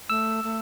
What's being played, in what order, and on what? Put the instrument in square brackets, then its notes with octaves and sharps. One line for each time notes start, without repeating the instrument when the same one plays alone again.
[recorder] A3 [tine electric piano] E6
[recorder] A3